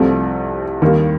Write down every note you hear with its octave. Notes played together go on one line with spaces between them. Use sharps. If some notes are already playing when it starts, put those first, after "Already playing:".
Already playing: C2 C3 F3 A3 C4
D#2 D#3 G3 A#3